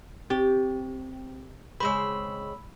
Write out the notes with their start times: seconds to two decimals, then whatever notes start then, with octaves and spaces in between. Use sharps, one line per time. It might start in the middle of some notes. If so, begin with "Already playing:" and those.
0.30 C4 G4
1.80 C#3 G#3 C4 B5 E6